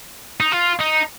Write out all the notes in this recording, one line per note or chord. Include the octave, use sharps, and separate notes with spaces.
D#4
F4
D#4